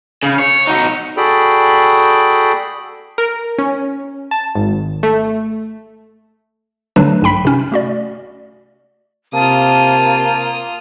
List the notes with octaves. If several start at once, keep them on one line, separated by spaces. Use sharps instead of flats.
C#3
C#5
D#4 F#4
F#4 G#4 A4 D5 G5 B5
A#4
C#4
A5
G#1
A3
D3 F#3 G3 A3 D4 B4
B1 G2 G5 B5 B6
C3 C#4
A3 F#4 D5
C3 A#3 F4 A5 D#6